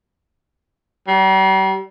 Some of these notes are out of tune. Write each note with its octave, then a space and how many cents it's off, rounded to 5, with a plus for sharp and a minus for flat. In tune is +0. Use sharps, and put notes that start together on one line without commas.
G3 -40